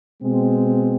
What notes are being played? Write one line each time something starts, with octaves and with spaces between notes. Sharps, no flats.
B2 G#3 C4